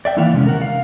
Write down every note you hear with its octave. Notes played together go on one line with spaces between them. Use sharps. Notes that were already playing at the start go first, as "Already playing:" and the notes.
D5 E5 G5
D#3 E3 A#3 E4 F5 F#5
C3 G#3 C4 C#4
A#4 F#5
F5